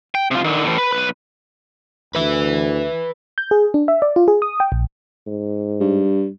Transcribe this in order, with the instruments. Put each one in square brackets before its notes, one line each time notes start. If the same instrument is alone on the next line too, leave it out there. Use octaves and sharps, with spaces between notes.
[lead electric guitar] G5
C3 F4
D3 D#3
A2 E3
B4
B1 B4
[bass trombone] D2 [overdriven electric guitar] B4 E5
[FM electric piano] G6
G#4
D4
E5
D5
F4
G#4
D#6
G5
A#1
[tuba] G#2
[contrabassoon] G2